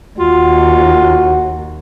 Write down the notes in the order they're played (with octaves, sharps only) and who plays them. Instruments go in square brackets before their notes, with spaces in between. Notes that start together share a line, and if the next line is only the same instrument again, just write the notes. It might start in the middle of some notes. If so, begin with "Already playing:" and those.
[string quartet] D#2 [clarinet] F4 [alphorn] F#4